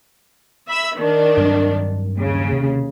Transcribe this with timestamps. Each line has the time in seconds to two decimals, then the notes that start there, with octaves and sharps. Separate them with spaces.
0.68 E5 B5 E6
0.97 D#3 D4
1.37 G2 F#3 C4
2.18 D#2 C#3
2.53 C3